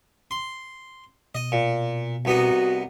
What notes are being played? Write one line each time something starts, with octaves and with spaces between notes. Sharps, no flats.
C6
B2 D#5
A#2
C2 B3 D#4 F#4